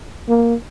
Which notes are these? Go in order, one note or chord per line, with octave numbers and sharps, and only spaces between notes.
A#3